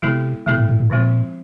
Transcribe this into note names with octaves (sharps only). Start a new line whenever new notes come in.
C3 G#3 B3 E4 A4
B2 G#3 B3 E4 A4
A2
A2
A2
A#2 D3 F3 G#3 C4 F4